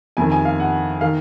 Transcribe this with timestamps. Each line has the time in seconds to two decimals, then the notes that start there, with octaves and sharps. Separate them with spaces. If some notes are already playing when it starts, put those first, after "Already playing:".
0.17 F2 D#3 G#5
0.32 G#5
0.45 F5
0.60 F#5
1.01 D#3 F5